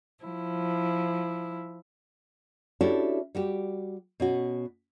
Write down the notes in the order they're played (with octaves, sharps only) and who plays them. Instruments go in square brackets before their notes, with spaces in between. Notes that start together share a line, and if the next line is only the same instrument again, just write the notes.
[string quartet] F3 E4
[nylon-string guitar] C#4 D4 E4 F#4 G4 A4
G3 F#4 G4
B2 C#4 F#4